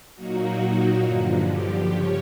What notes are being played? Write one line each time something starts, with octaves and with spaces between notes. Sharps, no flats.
A#2 F#3 A#3 D#4 F#4
G2 D3 F3
G4
C#3 C#5